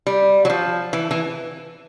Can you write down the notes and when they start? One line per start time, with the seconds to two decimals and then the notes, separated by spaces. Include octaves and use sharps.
0.07 G3
0.45 F#3
0.50 F3
0.93 E3
1.11 E3